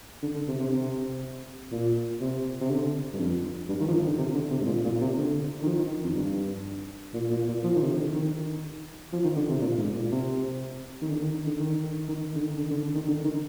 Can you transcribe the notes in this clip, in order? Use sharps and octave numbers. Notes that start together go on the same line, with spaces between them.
D3
D3
C3
C3
C3
A#2
C3
C3
D3
G2
F2
G2
D#3
F3
D#3
D3
C3
D3
C3
G#2
A#2
A#2
C3
D3
D#3
F3
D#3
F2
G2
A#2
A#2
A#2
F3
D#3
C3
D3
D3
D#3
F3
D#3
D3
C3
A#2
G#2
A#2
C3
D#3
D3
D#3
D3
D#3
D#3
D3
D#3
D3
D3
D3
D#3
D3
D#3